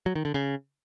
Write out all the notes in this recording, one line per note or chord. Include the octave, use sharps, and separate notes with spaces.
F#3
D#3
D3
C#3